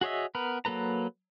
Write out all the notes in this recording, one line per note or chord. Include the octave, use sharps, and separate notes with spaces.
F#4 G#4 C#5 D#5 E5
B3 A#4 B4
F#3 A#3 A4 B4 A#5